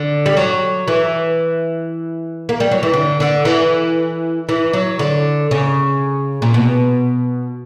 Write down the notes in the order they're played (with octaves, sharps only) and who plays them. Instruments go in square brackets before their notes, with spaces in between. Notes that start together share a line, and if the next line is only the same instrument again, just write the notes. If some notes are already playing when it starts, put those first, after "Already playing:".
Already playing: [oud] D3
G3
F#3
E3
A#3
G3
F#3
E3
D3
D3
E3
E3
F#3
D3
C#3
A#2
B2